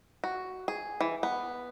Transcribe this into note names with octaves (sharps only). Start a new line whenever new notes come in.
F#4
G#4
E3
B3